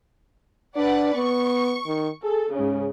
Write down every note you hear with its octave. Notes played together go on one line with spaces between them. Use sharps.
D4 B4 D5 F#5
B3 C#6
D#3
G#4 A4
G#2 C#3 C#4